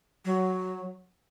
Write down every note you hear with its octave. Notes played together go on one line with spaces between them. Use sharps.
F#3